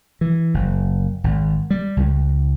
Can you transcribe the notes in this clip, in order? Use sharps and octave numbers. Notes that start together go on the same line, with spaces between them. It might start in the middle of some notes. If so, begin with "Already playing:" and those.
E3
F#1
G#1
G3
C#2